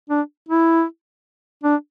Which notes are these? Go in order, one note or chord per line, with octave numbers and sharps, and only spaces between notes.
D4
E4
D4